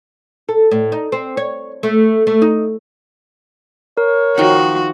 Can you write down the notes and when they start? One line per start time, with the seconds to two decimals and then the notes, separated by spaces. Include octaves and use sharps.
0.49 A4
0.71 A2
0.92 D#4
1.12 C4
1.37 C#5
1.83 A3
2.27 A3
2.42 D#4
3.97 A#4 C#5
4.38 D#3 F3 F#4